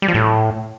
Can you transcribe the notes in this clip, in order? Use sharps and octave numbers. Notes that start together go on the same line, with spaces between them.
G3
F3
A2